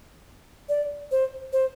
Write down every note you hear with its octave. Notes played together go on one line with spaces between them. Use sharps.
D5
C5
C5